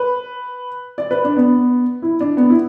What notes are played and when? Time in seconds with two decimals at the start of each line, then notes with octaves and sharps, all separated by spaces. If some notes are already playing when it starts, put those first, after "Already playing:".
Already playing: B4
0.98 D5
1.11 B4
1.24 D4
1.37 B3
2.02 E4
2.21 D4
2.37 B3
2.50 E4